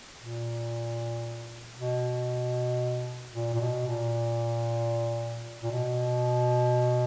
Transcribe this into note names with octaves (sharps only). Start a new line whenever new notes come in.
A#2
B2
A#2
A#2
B2
A#2
A#2
B2